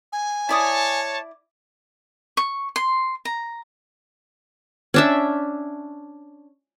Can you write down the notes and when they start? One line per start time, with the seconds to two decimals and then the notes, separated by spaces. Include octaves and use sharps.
0.13 G#5
0.49 E4 C#5 D5 A5 D#6
2.37 C#6
2.76 C6
3.25 A#5
4.94 C#4 D4 E5